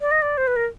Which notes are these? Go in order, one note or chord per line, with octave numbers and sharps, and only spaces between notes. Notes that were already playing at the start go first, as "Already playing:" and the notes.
D5
D#5
D5
C5
B4
A#4